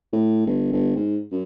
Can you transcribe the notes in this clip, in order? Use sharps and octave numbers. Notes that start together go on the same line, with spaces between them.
A2
G1
G1
G#2
F#2